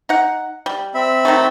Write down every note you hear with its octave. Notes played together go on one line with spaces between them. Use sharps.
D#4 F#5
G3
C4 E5 B5
D#3 F#3 A3